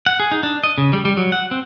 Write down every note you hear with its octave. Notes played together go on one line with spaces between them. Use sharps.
F#5
G#4
D#4
D4
D#5
C#3
G3
G3
F#3
F#5
C4